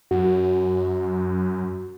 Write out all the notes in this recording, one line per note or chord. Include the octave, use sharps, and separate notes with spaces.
F#2 F#4